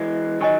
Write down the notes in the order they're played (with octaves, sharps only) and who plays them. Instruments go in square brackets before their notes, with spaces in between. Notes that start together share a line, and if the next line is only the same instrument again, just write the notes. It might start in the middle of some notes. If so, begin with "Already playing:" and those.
Already playing: [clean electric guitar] E3 G#3
[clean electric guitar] D#3 F#3 [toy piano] D#5 G#5 C#6